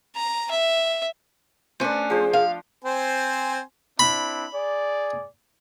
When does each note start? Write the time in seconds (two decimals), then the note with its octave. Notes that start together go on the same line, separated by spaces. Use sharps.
0.16 A#5
0.50 E5
1.80 A3 C#4 D4 B4 C5
2.10 F3 G#4 C5
2.33 F5
2.84 C4 C5 G#5
3.99 C4 D4 E4 B5
4.55 G#4 D5